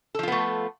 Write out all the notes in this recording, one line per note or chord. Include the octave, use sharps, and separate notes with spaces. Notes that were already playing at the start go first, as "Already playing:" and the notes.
F3 A3 B3 F4 A4